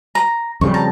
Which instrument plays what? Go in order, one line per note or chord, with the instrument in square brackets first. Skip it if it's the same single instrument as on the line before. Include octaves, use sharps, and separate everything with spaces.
[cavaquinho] A#5
[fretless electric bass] F2 C#3 G3 [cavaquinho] C#6
[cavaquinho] A5 A#5